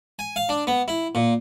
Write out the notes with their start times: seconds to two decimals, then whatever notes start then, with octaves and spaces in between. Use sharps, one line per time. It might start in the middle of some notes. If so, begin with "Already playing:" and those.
0.19 G#5
0.36 F5
0.49 D4
0.67 B3
0.88 E4
1.15 A#2